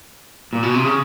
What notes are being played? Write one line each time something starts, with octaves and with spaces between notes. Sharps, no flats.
A#2
B2
C3
C#3